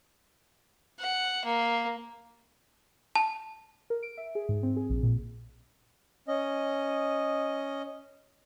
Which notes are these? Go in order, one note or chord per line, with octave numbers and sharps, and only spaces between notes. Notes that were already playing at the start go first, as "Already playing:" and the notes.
F#5
A#3
A5
A#4
D7
E5
G#4
G#2
C4
G#4
A#1
A#2
C#4 D#5